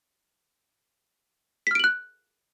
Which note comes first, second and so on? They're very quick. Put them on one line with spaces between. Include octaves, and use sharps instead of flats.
B6 F6 D7 F#7 F#6